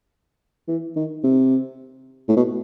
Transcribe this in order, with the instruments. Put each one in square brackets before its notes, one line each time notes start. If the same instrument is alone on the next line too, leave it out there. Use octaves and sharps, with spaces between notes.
[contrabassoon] E3
D#3
C3
A2
B2